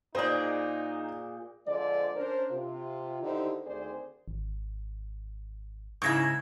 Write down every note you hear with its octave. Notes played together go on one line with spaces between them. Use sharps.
A#2 D#4 G#4 C5 D5 D#5 G5
D3 F3 G#3 C5 D5
C#4 D4 A#4 C5
C3 F4
D3 D#3 D#4 E4 G4 C5
D2 D#3 C4 G#4 C5 D5
G#1
G#2 C#3 E4 C#6 G#6 A#6